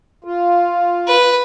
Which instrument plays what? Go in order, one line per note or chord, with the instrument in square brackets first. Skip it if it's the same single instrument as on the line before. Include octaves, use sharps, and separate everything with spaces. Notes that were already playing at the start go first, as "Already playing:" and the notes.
[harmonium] F4
[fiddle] B4